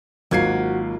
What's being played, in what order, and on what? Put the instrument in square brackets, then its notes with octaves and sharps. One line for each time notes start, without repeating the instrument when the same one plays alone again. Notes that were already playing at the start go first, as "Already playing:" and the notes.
[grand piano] G#1 G#6 C7 [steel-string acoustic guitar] F#3 A#3 F4 [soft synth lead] F#4